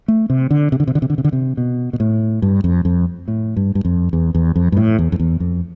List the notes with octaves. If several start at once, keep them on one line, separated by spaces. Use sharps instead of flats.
A3
C3
D3
C3
D3
C3
D3
C3
D3
C3
D3
C3
B2
B2
A2
G2
F2
F2
A2
G2
G2
F2
E2
E2
F2
G2
A2
E2
F2
E2
F2